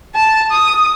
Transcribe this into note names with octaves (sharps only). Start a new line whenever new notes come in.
A5
D#6